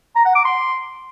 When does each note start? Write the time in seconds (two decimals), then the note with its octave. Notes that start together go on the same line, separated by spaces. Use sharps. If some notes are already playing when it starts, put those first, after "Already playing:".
0.16 A#5
0.25 F#5
0.35 D6
0.45 C6